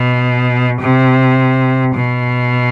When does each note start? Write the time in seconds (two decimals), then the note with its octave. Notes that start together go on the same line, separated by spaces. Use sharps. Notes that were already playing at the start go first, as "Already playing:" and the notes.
Already playing: B2
0.81 C3
1.95 B2